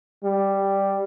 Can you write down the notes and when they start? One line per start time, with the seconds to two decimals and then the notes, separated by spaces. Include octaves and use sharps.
0.24 G3